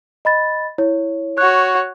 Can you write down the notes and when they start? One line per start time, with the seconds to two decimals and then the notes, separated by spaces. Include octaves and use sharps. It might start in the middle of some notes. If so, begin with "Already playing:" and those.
0.25 D#5 B5 A6
0.78 E4 C#5
1.38 F#4 C#5 F#6